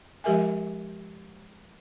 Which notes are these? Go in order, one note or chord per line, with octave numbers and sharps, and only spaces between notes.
F3 G#3 G4 A#4 E5 G#5